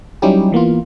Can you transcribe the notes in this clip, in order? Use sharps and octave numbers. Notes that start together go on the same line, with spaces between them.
F#3 G3 C#4 D#4 E4 G4
E3 A#3 B3 F4